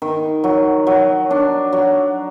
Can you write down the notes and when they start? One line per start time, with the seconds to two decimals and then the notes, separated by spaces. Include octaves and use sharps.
0.02 D#3
0.44 F#3
0.87 F#3
1.31 D4
1.73 F#3